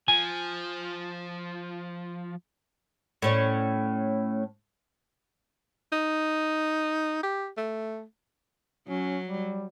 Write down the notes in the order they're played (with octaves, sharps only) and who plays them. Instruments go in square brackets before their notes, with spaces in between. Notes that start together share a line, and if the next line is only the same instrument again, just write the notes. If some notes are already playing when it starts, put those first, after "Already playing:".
[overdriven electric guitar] F3 [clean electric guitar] G#5
[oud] A2 C#4 D5
[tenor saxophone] D#4
G4
A3
[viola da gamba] F#3 [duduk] C#4
[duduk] G3